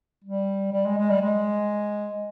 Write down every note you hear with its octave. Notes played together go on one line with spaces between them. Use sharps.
G3
G3
G#3
G#3
G3
G#3